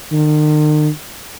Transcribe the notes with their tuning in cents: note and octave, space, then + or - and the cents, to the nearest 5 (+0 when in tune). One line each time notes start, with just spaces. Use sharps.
D#3 -45